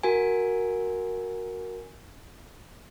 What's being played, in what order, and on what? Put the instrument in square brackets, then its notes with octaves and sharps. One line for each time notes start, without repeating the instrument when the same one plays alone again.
[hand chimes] F#4 A#4 G#5